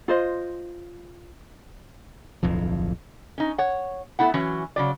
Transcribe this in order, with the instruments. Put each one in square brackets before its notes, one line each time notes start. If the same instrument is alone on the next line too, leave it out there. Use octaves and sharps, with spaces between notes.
[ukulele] F4 C5 D#5
[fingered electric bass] D1 B1 F2 F3
[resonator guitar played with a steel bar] C#4 D#4
C#5 F#5
A3 B3 E4 F#5
E3 F#3 C#4 F#4
C#3 F#3 D5